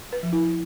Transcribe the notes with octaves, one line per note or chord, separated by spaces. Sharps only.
B4
F3
E4